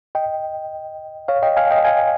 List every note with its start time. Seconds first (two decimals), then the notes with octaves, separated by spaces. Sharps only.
0.15 D#5 G5
1.28 C#5 F5
1.43 D#5 G5
1.57 F5 G#5
1.71 D#5 G5
1.85 F5 G#5